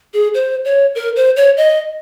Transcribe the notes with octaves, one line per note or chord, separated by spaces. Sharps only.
G#4
C5
C#5
A#4
C5
C#5
D#5